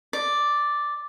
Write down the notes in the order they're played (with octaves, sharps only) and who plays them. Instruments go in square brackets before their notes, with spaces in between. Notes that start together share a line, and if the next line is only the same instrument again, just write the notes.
[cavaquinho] D5